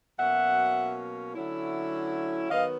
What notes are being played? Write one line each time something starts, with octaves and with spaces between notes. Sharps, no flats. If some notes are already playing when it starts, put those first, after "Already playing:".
B2 F#3 A#3 C#4 E5 F#5
D3 F#3 A3 C#4 E4
D#3 F#3 B3 D#5 F5